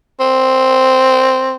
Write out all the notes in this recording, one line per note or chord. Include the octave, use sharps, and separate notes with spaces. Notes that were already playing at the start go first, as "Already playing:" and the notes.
C4